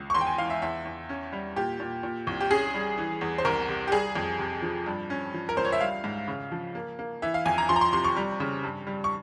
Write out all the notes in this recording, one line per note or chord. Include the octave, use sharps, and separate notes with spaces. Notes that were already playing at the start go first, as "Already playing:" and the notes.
Already playing: C#2
C#6
E2 C6
G5
G#5
E3 F5
E5
E2 E5
E2
C#4
G3
A#2 G4
A#2
A#2
C2
G4
C#4 G#4
G3
E3
E2
C5
C2 A#4
C3
G4
G3 G#4
F2
C3
F3
G2
C#4
F3
A#4
C#2 C5
C#5
E5
G3 F5
G#2
C#3
F3
A#3
A#3
E3 E5
F5
F2 G#5
A#5
F3 C6
A#5
C6
C3 C6
C#6
G3
C#3
G2
G3
C#6